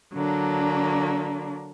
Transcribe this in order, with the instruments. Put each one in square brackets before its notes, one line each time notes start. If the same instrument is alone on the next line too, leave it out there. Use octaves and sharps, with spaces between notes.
[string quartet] D3 F#3 A#3 D4